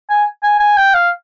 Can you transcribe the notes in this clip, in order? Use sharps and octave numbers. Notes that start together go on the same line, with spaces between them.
G#5
G#5
G#5
G5
F5